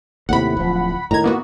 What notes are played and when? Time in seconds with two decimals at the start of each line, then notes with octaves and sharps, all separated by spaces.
0.29 D#2 A2 C3 F#5 B5
0.57 D1 F3
1.11 A2 D#3 A#5 G#6
1.24 A#3 B3 F#4